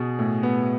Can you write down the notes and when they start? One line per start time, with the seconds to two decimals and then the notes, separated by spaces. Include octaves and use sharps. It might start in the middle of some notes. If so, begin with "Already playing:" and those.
Already playing: B2 G#4
0.19 A2
0.43 B3